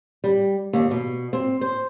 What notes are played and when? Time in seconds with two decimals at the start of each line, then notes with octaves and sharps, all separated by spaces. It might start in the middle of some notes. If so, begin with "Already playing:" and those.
0.24 G3
0.73 D#2
0.91 B2
1.33 C4
1.61 C5